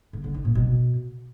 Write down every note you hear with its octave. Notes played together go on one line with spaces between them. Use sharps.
D3
D3
D#4
A#2
B2